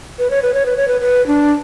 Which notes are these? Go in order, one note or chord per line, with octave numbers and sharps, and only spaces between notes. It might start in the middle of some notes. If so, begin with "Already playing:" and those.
B4
C#5
B4
C#5
B4
C#5
B4
B4
D4